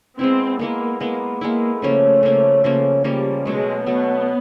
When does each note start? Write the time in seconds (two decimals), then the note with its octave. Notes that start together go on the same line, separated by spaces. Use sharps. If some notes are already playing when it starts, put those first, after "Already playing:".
0.19 G#3 B3 C4 E4
0.59 G#3 A#3 B3 E4
1.00 G#3 A#3 B3 E4
1.41 G#3 A#3 B3 E4
1.82 C#3 F3 A3 A#3 C#4
2.23 C#3 F3 A#3 C#4
2.64 C#3 F3 A#3 C#4
3.04 C#3 F3 G3 A#3 C#4
3.45 B2 F#3 G#3 A3
3.86 B2 F#3 A3 B3